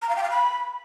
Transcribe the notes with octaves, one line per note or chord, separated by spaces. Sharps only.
A#5
F5
G5
F5
B5